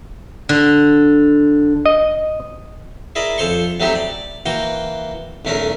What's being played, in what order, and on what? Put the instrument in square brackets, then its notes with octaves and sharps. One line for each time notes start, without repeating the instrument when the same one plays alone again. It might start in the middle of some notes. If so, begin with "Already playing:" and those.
[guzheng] D3
[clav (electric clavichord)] D#5
[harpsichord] E4 G#4 A#4 D5 D#5
F2 A4 C5 C#5 C6 C#6
F#3 A3 C4 D#4 E4 G4
D5
E3 A#3 F#4 G5 A#5
B1 E2 A3 C#4 D4 A#4